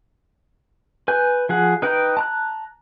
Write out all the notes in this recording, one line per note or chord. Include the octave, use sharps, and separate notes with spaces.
B4 G#5 G6
F3 G#4 F#5
D#4 B4 G5 A#5 G6
A5 A#5 F#6